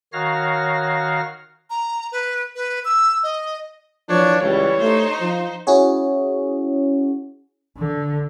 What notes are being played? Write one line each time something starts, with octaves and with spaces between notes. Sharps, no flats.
D#3 F#4 C#5 F5 F6 A#6
A#5
B4
B4
E6
D#5
E3 F3 D4 C#5
C#2 E3 G3 C#5
A3 D#4 C5
F3
C#4 E4 F#4 G#4 C#5
D3